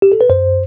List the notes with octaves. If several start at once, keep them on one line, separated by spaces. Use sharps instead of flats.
G4
A4
B4
F#2 C5